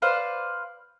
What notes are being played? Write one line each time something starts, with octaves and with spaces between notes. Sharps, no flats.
B4 C5 D5 F5